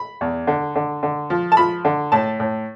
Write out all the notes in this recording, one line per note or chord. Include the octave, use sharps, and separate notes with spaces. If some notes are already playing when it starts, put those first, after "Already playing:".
Already playing: B5
E2
D3
D3
D3
F3
A5
F3 B5
D3
A2 A5
A2